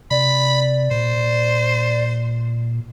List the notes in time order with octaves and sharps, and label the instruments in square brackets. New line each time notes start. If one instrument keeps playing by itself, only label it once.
[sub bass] C3 [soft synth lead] D5 [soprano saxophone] B5
[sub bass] A#2 [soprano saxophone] C5